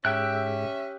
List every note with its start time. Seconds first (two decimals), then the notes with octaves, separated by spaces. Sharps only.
0.05 G#2 C#4 G4 E5 G5 F#6